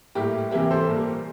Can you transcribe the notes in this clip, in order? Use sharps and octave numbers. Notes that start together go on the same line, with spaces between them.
A2 G3 A#3 E4 G4
C3 E3 G3 A#3 E4 G4
A4 C5
A#2 G3 A#3